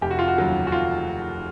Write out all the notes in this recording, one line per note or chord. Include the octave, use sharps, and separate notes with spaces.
F1 G4
F#4
F4
F#4
D#2 C#3 F#3
F#4
F1 F4